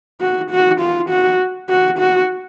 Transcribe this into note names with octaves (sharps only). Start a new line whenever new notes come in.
F#4
F#4
F4
F#4
F#4
F#4